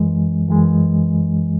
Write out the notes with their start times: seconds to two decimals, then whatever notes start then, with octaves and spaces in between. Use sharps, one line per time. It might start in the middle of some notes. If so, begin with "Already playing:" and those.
Already playing: F#2 E3 G#3
0.48 F#2 E3 G#3